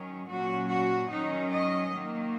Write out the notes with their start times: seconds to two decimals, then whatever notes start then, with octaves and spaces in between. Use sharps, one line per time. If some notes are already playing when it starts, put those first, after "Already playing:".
Already playing: D#3 F#3 C#4
0.27 A#2 F#3 C#4 F#4
0.68 F#4
1.09 D#3 F#3 C#4 D#4
1.50 D#5
1.92 D#3 F#3 A#3